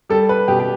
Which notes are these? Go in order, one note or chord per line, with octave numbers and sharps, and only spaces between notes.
G3 A4
B4
B2 G4
G4